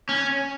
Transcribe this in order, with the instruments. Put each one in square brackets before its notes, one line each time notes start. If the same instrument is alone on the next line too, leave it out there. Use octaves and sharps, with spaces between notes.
[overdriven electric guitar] C#4